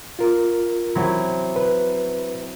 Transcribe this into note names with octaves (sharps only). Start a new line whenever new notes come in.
F4 A#4
F#3 C4 E4
B4